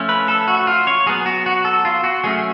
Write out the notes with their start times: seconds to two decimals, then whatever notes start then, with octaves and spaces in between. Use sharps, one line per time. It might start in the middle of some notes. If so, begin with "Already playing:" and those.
Already playing: F3 A3 C#4
0.09 B4
0.28 A4
0.48 F#4
0.67 F4
0.87 C#5
1.06 F#3 B3 G#4
1.26 F#4
1.46 F#4
1.65 A4
1.85 F4
2.04 F#4
2.24 F#3 A3 C#4 G#4